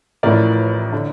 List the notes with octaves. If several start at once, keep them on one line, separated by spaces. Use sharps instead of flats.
A1 A2 F3 A#4 D5
D3